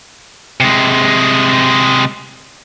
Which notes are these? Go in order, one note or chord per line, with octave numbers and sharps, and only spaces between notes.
C3 G#3